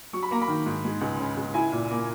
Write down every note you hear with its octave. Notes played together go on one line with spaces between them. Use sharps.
F#3 C#6
B5
A#3 A#5
B5
D#3
G#2
G#3
C#2
C#3
C#2
E4 G#5
A#2
A#3